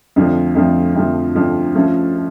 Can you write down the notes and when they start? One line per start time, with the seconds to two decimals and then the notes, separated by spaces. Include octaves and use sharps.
0.16 F2 D3 F3 A3
0.55 F2 D3 F3 A3
0.96 F2 D3 F3 A3
1.35 F2 D3 F3 A3
1.75 F3 A3 C#4 F4 A4
2.15 A4